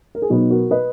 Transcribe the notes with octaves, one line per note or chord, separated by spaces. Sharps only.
A#4
G#4
B2 F#3 B3 D#4 F#4
F#4 A#4
B4 D#5